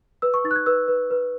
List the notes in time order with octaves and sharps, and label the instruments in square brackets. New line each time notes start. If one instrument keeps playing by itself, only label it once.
[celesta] B4 E6
C#6
D#4 A6
F#6
G#6
B4 E6
B4
B4